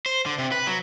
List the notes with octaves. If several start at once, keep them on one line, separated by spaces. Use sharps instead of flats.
C5
D3
C3
B4
F#3